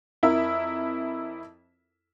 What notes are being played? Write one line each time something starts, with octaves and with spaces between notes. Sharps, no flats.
F2 E4 A#4 E5